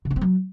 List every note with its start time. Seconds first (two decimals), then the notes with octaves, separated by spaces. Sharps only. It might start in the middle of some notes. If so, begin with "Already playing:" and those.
0.05 C#3
0.11 D4
0.16 C4
0.21 F#3